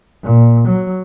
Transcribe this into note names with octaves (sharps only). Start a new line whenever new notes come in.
A#2
F#3